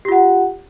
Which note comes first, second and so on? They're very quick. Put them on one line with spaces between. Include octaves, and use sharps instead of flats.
G4 F4 F#5